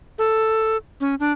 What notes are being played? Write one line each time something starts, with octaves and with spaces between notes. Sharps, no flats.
A4
C#4
D4